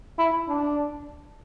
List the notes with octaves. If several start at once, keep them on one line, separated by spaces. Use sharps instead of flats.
E4
D4